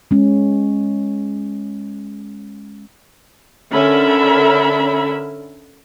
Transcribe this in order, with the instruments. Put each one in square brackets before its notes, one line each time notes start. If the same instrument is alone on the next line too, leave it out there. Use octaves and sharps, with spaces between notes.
[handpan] G#3 C#4
[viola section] D3 C#4 A#4 E5 B5